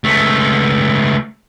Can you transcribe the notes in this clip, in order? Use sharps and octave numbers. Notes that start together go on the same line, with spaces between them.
C#2 A3